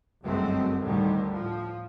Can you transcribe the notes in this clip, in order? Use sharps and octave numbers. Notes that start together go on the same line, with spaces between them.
G1 C2 F#2 G#3 A3 C4
D2 A2 D3 D#3 G3
A2 F3